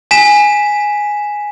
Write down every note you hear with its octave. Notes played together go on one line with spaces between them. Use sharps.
G#5 B6 E7